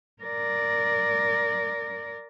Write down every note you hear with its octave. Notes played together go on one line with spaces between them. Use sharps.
A#4 D5